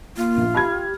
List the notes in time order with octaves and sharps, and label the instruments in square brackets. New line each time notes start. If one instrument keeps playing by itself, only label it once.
[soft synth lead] A#3 [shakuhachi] F4
[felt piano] A#1
[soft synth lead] G4 [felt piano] B5 F6 G#6